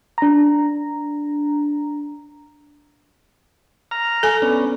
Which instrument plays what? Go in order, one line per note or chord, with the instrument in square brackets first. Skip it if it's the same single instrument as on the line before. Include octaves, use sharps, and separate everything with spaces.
[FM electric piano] D4 A#5
[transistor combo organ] A#5 F6
[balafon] A4 G#5
[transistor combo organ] B3 C#4 D4